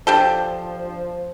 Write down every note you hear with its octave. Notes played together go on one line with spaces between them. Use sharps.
F3 D4 G4 A4